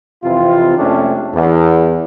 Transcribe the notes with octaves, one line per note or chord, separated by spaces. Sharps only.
F2 C3 E3 F4
F2 C3 G#3 A3 C#4 D4
E2